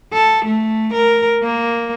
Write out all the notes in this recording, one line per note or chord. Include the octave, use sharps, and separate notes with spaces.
A4
A3
A#4
A#3